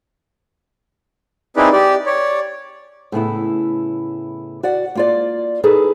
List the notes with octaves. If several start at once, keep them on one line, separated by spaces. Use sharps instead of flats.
C4 D#4 E4 G#4 B4 D5
G4 D5
C#5 D5
A2 C#3 B3 E4
F#4 D5 F#5
A#3 F4 D5
D#4 G#4 A4 B4